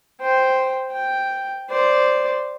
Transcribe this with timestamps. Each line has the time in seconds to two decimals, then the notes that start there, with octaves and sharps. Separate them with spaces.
0.21 C5 G5
0.92 G5
1.69 C5 D5